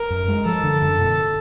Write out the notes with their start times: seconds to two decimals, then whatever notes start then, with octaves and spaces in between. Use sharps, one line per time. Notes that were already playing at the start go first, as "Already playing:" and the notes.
Already playing: A#4
0.10 F#2
0.28 G#3
0.46 F3 A4
0.64 D3
0.82 F#2
0.99 B2